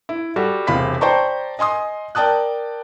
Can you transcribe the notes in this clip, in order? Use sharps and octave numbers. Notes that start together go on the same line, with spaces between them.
E4
G3 F#4 A4
E1 C3 F5 B5 B6
C5 D5 G5 A5 A#5 C#6
D#5 G#5 C6 D#6
A#4 D5 G5 A5 D#6 F#6